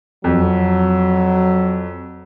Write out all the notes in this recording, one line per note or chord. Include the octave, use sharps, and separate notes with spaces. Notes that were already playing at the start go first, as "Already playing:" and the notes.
F2 F#3